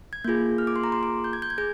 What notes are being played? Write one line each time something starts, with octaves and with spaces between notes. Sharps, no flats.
G#6
A#3 F4 G#4 G6
F6
D6
C6
A#5
C6
D6
G6
G#6
G6
G#6
G#4 G6